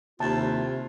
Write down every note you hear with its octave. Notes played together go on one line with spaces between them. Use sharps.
D#2 C3 A3 E4 F4 A5